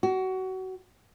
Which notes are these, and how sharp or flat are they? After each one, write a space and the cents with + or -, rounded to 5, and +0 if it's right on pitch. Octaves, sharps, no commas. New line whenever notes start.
F#4 +25